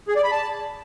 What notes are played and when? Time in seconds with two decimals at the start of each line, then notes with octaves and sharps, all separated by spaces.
0.08 G#4
0.16 D5
0.24 B5
0.32 A5